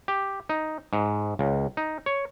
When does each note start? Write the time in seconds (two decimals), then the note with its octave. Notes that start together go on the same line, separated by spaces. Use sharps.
0.08 G4
0.49 D#4
0.93 G#2
1.39 C#2
1.77 D#4
2.06 C#5